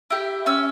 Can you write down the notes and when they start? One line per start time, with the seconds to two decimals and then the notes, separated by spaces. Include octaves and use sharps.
0.10 E4 G4
0.46 C#4 E6